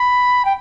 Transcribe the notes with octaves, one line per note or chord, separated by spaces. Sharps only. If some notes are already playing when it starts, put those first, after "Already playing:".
Already playing: B5
G5